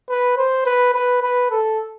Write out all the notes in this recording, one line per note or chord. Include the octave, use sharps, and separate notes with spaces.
B4
C5
B4
B4
B4
A4